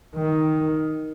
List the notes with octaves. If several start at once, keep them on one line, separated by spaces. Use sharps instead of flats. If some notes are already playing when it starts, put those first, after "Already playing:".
D#3